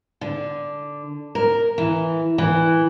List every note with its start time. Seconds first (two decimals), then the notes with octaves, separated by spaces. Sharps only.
0.21 D3
1.35 A#4
1.78 E3
2.38 E3